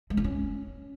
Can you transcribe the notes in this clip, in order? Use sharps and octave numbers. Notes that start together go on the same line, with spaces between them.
G#3
D4
C#4